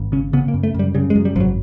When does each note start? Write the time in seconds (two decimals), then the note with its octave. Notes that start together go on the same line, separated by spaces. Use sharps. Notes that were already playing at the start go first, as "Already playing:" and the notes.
Already playing: G#1
0.12 C#3 C#4
0.33 C#3 B3
0.48 A#3
0.54 F#2
0.63 A3
0.74 F#2 G3
0.95 C#3 G3
1.10 G#3
1.15 F#2
1.25 G3
1.36 G#1 F3
1.40 F#3